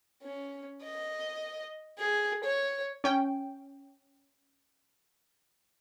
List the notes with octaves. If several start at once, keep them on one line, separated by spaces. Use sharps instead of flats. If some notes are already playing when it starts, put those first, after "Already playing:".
C#4
D#5
G#4
C#5
C#4 G5